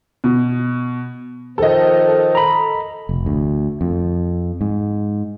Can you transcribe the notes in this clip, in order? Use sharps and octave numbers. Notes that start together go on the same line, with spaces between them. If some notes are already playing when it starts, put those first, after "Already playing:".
B2
D#3 F3 A4 D#5
A#5 B5
F1
D2
F2
G#2